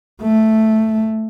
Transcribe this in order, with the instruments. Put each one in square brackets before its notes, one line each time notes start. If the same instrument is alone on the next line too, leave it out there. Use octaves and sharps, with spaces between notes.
[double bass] A3